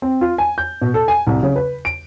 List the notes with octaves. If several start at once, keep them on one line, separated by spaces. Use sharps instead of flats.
C4
F4
G#5
G6
B2
A4
G#5
C2
C#3
B4
D7